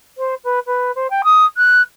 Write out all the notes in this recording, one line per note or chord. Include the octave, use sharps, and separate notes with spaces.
C5
B4
B4
C5
G5
D#6
F#6